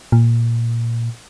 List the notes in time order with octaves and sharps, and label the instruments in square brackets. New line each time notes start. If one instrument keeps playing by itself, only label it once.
[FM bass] A#2